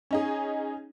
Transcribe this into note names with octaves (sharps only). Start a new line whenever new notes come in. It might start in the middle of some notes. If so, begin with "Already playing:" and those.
C#4 D#4 G#4